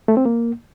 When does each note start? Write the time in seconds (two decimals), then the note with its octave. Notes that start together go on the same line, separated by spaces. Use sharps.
0.08 A3
0.17 C4
0.25 A#3